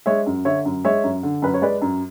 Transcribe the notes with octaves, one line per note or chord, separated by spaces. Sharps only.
G#3 C#5 E5
F#2
D3 C#5 E5
F#2
G#3 C#5 E5
F#2
D3
F#2 B4
C#5
G#3 B4 D5
F#2